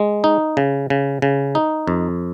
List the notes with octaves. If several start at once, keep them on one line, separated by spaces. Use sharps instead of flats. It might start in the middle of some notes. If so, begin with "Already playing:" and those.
Already playing: G#3
D#4
C#3
C#3
C#3
D#4
F2